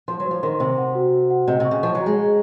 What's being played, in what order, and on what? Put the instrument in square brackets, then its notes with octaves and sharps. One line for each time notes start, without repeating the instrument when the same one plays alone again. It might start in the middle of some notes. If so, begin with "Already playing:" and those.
[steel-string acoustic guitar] F3 [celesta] C6
[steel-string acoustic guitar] F#3
[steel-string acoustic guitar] F3 [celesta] C5
[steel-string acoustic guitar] D#3 [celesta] C6
[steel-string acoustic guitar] C3 [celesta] C5
[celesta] F#5
F#4
F#4
F#5
[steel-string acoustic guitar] C3 [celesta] D#5
[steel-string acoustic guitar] C3 [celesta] C#6
[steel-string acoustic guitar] C#3
[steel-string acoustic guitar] F3 [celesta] C#6
[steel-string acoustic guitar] F#3
[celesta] A#5
[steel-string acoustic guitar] G#3
[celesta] G#4